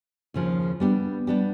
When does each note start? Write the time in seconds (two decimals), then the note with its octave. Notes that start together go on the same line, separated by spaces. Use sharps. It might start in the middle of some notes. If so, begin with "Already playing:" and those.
0.34 D#2 C#3 F3
0.80 G3 B3 D4 G4
1.27 G3 B3 D4 G4